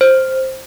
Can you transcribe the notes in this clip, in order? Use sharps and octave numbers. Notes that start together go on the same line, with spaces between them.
C5